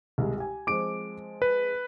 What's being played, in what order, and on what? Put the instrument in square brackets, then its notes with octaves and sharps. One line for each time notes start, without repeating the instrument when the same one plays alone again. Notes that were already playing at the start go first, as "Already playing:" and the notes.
[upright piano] C2 G3 G#3
G4 G#5
[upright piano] F3 G#3 C4 [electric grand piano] D6 D7
[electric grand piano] B4